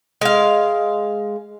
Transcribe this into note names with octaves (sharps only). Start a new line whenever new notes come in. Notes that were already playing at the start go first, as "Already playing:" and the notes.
G#3 F5